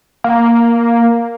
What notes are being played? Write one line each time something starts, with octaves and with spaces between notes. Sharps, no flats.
A#3